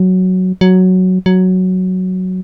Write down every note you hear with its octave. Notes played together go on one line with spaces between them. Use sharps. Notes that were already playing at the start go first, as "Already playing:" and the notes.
Already playing: F#3
F#3
F#3